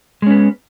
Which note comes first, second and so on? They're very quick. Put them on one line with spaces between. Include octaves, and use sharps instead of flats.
G#3 C#4 B3